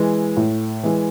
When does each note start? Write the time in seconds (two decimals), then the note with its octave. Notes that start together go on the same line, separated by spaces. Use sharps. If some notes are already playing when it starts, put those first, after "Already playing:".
Already playing: E3 G#3
0.37 A2
0.83 E3 G#3